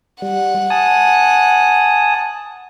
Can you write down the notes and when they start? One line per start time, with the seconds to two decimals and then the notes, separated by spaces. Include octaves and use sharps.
0.22 G3 F#5
0.70 G#5 A5 D#6